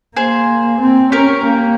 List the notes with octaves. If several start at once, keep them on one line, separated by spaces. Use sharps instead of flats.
A#3 G#4 C5
C4
C#4 G4 A#4
A#3